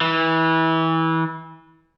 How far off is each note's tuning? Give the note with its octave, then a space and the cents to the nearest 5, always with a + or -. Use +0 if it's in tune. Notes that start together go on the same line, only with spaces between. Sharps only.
E3 -25